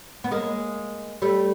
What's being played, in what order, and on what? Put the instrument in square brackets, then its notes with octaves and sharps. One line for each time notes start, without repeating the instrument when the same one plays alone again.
[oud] B3
G#3 A#3
G3 A3